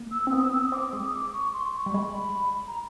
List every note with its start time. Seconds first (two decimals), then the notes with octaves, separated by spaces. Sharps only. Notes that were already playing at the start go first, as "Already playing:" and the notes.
Already playing: A#3
0.11 E6
0.27 C4
0.32 B3 D#6
0.42 E6
0.52 E6
0.62 D#6
0.72 C4 D6
0.93 G#3 D#6
1.14 D6
1.33 C#6
1.54 C6
1.75 C#6
1.86 G3
1.94 G#3 B5
2.68 A#5